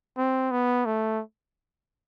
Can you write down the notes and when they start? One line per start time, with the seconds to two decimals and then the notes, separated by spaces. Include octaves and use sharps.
0.18 C4
0.51 B3
0.86 A3